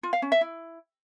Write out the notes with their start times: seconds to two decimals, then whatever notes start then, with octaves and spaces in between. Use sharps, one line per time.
0.03 F4
0.13 F5
0.22 C#4
0.32 E5
0.41 E4